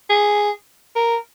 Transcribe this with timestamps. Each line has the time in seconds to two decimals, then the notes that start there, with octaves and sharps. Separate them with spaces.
0.09 G#4
0.96 A#4